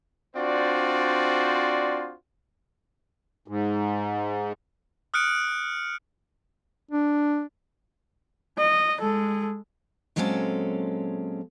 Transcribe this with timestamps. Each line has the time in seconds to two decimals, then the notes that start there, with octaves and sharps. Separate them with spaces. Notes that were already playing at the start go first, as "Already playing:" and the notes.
0.36 C4 D4 F4 F#4 C5 D5
3.48 G#2
5.14 D#6 F6 F#6 C#7 D7
6.91 D4
8.58 D#5
9.01 G#3 A4
10.16 A#2 F#3 G#3 C4 C#4 A4